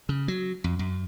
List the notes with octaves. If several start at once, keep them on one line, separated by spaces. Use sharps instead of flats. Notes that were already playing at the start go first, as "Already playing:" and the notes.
C#3
F#3
F2
F#2